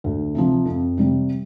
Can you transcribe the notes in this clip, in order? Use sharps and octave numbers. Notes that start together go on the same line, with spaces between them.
D2
C3 F3
F2
C3 G3